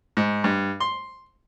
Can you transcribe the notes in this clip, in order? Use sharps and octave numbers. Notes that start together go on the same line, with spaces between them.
G#2
G2
C6